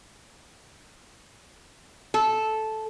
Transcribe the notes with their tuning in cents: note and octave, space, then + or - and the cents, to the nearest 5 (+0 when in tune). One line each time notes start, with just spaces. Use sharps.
A4 -10